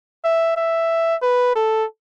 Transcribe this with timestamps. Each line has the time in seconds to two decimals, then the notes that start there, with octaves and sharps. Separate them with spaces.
0.24 E5
0.56 E5
1.22 B4
1.55 A4